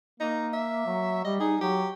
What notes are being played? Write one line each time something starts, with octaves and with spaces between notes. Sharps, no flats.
A#3 D#4
E5
F#3
G3 D#5
D#4 G#4
F#3 G4